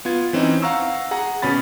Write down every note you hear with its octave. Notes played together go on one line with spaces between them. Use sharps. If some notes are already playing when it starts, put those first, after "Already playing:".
B3 F4 G#6
E3 C4 C#4 D#4
F5 F#5 A#5 C#6 E6
G#4 F#5 A#5
G#1 B2 C#4 G#4 B5 A6